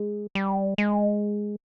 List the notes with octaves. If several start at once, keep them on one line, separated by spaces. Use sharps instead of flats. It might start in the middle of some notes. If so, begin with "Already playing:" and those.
Already playing: G#3
G3
G#3